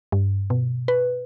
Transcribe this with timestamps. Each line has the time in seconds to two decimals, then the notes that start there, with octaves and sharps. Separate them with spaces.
0.12 G2
0.50 B2
0.88 B4